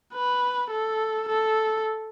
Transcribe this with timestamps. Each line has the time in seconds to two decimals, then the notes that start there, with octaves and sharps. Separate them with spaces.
0.14 B4
0.71 A4
1.29 A4